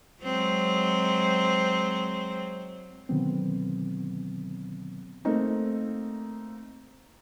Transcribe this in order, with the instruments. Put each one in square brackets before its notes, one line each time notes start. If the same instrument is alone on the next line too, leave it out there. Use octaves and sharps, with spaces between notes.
[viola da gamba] F#3 G#3 C4
[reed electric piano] B2 D3 D#3 F#3 B3 C4
[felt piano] A3 A#3 C4 D#4